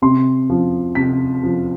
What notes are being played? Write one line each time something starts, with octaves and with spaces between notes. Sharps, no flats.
C3 C6
F3
C3 B6
F3